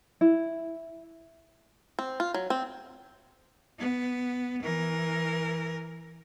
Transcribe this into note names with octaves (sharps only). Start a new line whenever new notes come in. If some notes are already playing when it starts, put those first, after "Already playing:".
E4
C4
F4
F#3
C4
B3
E3 A#4